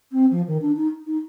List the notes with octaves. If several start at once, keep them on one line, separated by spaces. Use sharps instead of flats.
C4
F3
D#3
D4
D#4
D#4